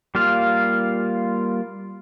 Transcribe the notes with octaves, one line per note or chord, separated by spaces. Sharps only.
G3 A#3 F4 F5